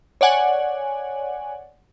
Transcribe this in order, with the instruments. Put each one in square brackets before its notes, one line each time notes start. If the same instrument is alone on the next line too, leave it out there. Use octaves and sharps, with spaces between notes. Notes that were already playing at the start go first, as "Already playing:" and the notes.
[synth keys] C#5 D5 F#5 G#5